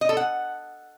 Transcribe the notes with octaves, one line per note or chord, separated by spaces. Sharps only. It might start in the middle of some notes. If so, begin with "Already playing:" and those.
D#5
A4
F#5